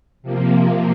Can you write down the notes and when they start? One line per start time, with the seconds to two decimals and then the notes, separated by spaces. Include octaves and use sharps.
0.22 C3 F3 A#3